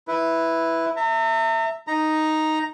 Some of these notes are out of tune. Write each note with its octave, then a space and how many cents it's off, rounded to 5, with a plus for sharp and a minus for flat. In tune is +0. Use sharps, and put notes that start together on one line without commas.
E4 +0 B4 +0
E5 +0 A#5 -45
D#4 +0 A#5 +0